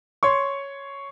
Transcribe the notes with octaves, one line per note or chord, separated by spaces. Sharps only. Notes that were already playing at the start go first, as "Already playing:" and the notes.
C#5 C6 C#6